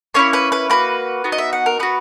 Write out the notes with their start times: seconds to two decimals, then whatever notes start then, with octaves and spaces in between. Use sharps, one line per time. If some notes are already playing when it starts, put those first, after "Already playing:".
0.14 A#3 C#4 E4 C#5
0.33 B4
0.52 B4
0.70 A#3 D#4 F#4 B4
1.24 B3 D#4 F#4
1.32 D#5
1.38 E5
1.53 F#5
1.66 A#4
1.80 B3 F#4 B4